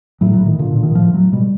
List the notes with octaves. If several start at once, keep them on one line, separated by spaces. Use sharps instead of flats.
A2 F#3
F#3
A2
D#3
A#2 D3
D3
A#2
D#3
A2 F3
A2 F#3
B2 G3